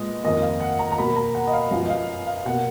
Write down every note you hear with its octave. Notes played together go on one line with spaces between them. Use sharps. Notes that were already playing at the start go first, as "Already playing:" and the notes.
Already playing: A#2 G#3 B3 D#5
F2 D#3 A#3 D#5
F5
F#5
A#5
A#5
B2 F#3 A#3 B5
A#5
F#5
D#5
F5
F#2 F3 B3 F5
D#5
F5
F5
B2 A#3 F#5